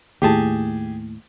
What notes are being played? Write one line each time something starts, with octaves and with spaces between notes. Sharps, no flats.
D#2 A2 G4 G#4 A5